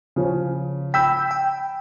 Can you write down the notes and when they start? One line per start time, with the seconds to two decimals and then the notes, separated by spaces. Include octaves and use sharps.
0.16 C#3 F3 C#4
0.94 G5 B5 E6 G6 B6
1.31 G5